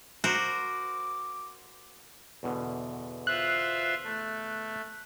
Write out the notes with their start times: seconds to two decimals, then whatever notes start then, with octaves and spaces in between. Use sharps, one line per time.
0.24 F#4 A#4 C5 D6
2.43 E2 B2 D3
3.27 F4 C5 E5 F#6
4.04 A3